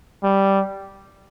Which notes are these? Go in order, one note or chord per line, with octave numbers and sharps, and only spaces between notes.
G3